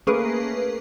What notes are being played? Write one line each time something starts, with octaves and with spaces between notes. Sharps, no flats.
A3 A#3 C#4 G#4 A#4 B4